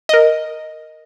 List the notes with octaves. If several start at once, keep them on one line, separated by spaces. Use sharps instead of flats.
A#4 D#5